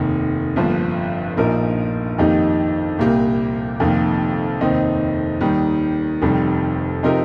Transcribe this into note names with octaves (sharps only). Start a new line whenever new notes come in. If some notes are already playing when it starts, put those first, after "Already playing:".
Already playing: F1 D#2 D#3
G1 G2 F3 A#3
A#1 A#2 F3 D#4 A#4
F2 D#3 A#3 D#4 G4
C2 A#2 A#3 G4
F1 F2 D#3 A#3
F1 D#2 D#3 C4 D#4
D#2 D#3 G3
F1 F2 D#3 G3
C3 F3 D#4 G4 A#4